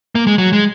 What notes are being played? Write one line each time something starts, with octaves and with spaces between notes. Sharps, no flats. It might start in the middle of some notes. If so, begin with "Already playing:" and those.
A#3
G#3
F#3
G#3